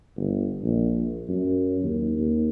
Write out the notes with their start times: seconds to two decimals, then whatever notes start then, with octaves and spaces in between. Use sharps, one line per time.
0.16 G1
0.62 A#1
1.29 F#2
1.83 D#2
2.17 D#2